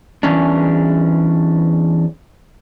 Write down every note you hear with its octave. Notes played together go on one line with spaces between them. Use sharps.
E2 G#2 E3 C#4 D4